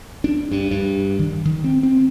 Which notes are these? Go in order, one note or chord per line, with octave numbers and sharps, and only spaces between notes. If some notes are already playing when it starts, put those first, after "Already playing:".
D4
G2
G2
D#3
D#3
C4
C4